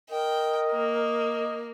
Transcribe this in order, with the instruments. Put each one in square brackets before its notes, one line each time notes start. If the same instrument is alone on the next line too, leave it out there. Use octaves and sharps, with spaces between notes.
[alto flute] A#4 [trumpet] D#5 [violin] G5
[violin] A#3